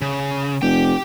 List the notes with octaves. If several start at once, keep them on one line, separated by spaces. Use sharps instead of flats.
C#3
F1 G4 G5